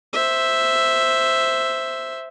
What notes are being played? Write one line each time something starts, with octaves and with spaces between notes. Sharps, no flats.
C5 E5